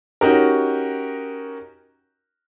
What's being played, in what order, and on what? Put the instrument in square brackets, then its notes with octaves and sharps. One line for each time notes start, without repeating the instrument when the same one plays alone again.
[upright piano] C#4 D#4 F#4 G4 A#4